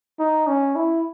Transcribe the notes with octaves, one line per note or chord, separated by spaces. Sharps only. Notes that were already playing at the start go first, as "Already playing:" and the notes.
D#4
C#4
E4